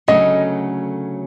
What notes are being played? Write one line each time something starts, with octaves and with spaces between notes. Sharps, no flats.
D2 C#3 F#3 A3 C#4 D#5